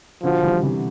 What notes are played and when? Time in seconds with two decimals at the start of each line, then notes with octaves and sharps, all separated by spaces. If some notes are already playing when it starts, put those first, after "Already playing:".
0.23 B2 D3 F3
0.42 E3 G3
0.63 C3 E3